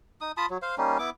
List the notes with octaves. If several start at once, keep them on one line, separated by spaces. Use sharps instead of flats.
D#4 D#6
F4 A5 B5 D#6
F#3
C5 F5
G3 A#3 C#4 D#4
B3 E4 D6